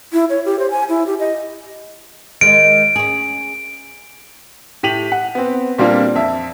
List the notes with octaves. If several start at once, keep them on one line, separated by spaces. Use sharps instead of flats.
E4
C#5
G4
C5
G#5
E4
G4
D#5
D#3 G#3 D7
C#4 G#4
A2 G4 B6 D#7 F7 F#7
F#5
B3 C4
A#2 G3 A#3 C4 D4 F4
F2 E5